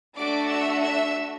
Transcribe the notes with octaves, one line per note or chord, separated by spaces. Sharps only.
A3 D4 F#4 D5 D6
E5 E6
E5 E6